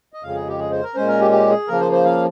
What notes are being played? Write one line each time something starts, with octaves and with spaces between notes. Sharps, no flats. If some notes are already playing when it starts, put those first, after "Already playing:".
D#5
F2 C#3 G#3 F5
G#4
G4
G#4
C5
A#4
A#2 G#3 C#4 C5
A#4
G4
G4
G#4
C#3 F3 A#3 A#4
C5
C5
F5